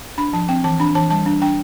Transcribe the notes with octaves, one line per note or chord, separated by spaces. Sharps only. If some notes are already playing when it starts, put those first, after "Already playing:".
D4 B5
F3 A5
C4 G5
E3 A5
D4 B5
E3 A5
G3 A5
D4
D4 G5